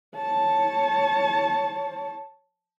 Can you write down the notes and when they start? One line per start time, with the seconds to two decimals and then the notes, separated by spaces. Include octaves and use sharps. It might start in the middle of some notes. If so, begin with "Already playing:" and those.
0.16 C#5 A5